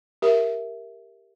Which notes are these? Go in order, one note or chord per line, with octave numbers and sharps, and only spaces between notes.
G4 A#4 E5